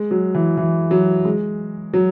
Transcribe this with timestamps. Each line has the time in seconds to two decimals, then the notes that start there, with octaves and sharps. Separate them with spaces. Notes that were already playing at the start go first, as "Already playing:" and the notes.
Already playing: G#3
0.11 F#3
0.34 E3
0.57 E3
0.91 F#3
1.25 G#3
1.94 F#3